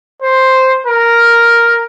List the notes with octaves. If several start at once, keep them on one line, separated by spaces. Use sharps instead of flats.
C5
A#4